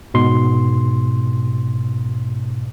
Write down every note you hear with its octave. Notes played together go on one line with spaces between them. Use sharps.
G#2 B2 C6